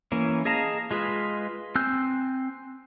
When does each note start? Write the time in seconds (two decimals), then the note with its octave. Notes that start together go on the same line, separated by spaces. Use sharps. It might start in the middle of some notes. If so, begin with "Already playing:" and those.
0.12 E3 A#3 C#4
0.45 G#4 D#5 F5 A5 A#5
0.91 G#3 F4 G#4 B4
1.75 C4 G#5 E6 F#6 G6